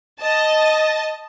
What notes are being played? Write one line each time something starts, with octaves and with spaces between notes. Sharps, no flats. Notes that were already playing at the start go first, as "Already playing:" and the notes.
D#5 A5